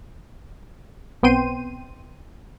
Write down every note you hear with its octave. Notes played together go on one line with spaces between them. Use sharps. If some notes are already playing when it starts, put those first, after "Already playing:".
B1 B3 C4 G5 C6 D#7